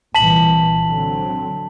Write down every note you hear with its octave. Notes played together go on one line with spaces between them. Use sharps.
C2 A#2 E3 A5 B6 F#7
D3 F#3 C4